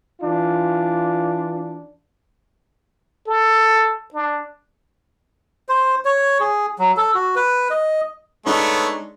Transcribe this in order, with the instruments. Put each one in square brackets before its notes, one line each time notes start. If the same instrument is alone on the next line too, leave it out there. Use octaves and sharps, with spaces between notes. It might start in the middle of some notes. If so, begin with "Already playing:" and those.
[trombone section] E3 D4 F4
[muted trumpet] A4
D4
[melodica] C5
C#5
G#4
F#3
A4
F#4
B4
D#5
[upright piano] G#3 D4 D#4 [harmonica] A3 B3 C#5